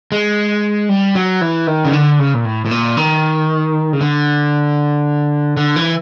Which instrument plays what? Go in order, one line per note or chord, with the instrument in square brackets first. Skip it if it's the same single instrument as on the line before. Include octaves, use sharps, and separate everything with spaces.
[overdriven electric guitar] G#3
G3
F#3
E3
D#3
C#3
D3
C#3
A#2
A2
A2
A#2
D#3
C#3
D3
D3
E3